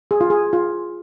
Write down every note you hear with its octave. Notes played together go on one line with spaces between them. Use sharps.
G#4
F4
G#4
F4